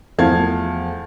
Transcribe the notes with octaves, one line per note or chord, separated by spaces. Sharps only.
E2 F3 A3 F5 A5 G#6